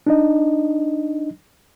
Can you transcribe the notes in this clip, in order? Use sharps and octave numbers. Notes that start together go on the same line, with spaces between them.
D4 D#4 D#5